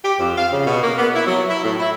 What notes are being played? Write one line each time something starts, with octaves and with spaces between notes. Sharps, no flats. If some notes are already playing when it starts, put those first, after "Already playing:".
G4
F2
F5
C#3
B2
A#3
B3
E4
F#3
E4
A2
E4